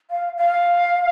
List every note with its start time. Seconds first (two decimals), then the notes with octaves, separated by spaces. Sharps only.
0.11 F5
0.37 F5